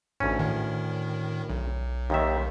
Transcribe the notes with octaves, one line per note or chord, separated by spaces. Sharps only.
A1 D2 G#2 C#4
A2 D#3
B1
D#2 D#3 E5